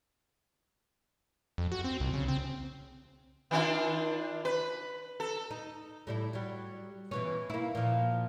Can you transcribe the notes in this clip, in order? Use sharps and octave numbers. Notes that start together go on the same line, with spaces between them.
F2
F#4
C4
C2
C#3
C4
D#3 D4 F4
B4
A4
D#4
A2 G3 E4
F#3 G3
B2 E3 C#4
A#3 E4
A#2 F3